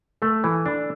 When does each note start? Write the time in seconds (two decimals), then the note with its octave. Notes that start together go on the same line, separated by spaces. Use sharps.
0.22 A3 A4
0.44 E3
0.66 D4